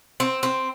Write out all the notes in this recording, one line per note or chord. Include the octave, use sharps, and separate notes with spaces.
C4
C4